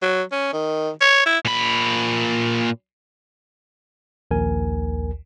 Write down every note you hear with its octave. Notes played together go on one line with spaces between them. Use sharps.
F#3
C#4
D#3
C#5
E4
A#2 B5
A#1 D#2 A#4 G#5